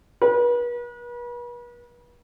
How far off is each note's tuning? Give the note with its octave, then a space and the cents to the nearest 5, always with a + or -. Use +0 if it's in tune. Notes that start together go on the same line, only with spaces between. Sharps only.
B4 -40